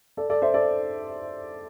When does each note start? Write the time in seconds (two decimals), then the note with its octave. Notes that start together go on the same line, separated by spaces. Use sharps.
0.17 A4 D5
0.30 A4 D5
0.42 C5 E5
0.54 A4 D5